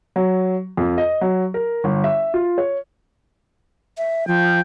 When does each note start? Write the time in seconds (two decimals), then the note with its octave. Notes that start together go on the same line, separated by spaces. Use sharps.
0.16 F#3
0.77 F2
0.98 D#5
1.21 F#3
1.54 A#4
1.84 G1
2.04 E5
2.34 F4
2.58 C#5
3.98 E5
4.28 F3 G5